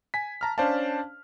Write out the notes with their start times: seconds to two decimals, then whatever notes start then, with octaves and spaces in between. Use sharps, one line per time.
0.14 G#5 B6
0.41 A5 A#5 F6
0.58 C#4 D4 C5 D5 F5 A5